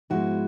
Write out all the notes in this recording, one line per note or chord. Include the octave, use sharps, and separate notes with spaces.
G#2 F3 G#3 B3 E4 F#4